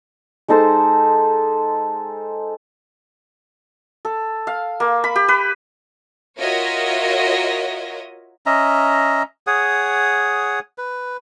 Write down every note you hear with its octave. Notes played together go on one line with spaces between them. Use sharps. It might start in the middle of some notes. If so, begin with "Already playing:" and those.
G#3 D#4 A4 C5
A4
F5
A#3
B5
G4
B4
F4 F#4 A#4 C#5 D#5 E5
C#4 D#5 E5 A#5
G#4 C#5 F#5 D#6
B4